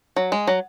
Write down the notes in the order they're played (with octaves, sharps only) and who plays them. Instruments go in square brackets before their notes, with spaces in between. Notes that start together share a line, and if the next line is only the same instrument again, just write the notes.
[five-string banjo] F#3
G#3
F#3